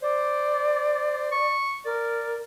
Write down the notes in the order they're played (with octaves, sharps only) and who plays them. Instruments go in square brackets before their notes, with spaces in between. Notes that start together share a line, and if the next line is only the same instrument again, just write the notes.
[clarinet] C5 [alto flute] D5
[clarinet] C#6
[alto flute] A#4 [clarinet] D5